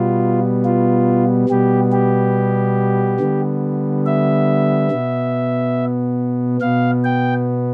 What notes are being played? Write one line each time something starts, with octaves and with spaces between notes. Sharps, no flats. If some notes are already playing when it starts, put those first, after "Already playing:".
Already playing: B2 G3 B3 F4
F4
B2 G3 B3 G4
G4
D3 G3 B3
E5
B2 B3
B2 B3 F5
G5